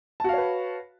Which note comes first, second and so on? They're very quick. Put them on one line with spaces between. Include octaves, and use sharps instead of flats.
A5 F#4 F5 C#5 B4